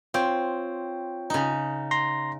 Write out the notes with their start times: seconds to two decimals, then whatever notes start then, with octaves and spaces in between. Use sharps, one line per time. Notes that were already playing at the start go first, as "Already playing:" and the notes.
0.14 C4 F4 C#5 G5
1.30 C#3 D#4
1.91 A#5 C6 A#6